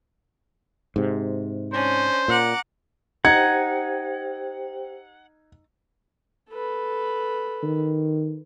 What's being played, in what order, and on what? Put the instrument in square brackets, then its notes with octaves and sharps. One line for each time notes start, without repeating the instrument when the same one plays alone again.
[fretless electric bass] G#2 C3
[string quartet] C#4 D4 [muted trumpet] C5
[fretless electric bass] A#2 [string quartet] F#5 A#5 D6
[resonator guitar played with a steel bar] D#4 [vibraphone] G4 C5 G5 [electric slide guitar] F#5 [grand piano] G#6
[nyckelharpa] A4 B4
[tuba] D#3